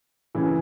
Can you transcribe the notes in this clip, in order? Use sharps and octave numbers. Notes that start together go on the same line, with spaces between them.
C#3 E3